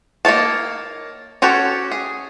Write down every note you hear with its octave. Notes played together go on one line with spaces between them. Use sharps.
A#3 D#4 C#5 A5
C#4 F#4 G4 A4 C#5
G#4